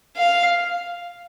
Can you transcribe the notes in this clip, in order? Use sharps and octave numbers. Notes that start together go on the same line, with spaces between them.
F5